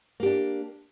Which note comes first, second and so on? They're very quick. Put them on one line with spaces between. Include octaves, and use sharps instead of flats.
A#3 G4 D4